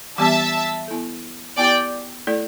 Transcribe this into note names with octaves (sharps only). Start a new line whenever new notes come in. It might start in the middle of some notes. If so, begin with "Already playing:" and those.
E3 G3 B3 G4 E5 A5
B3 E4 A4
B3 E4 G4 D5 G5
A3 E4 A4 D5